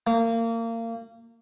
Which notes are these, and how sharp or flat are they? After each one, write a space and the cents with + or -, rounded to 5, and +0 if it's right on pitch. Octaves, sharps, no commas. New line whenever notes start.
A#3 -30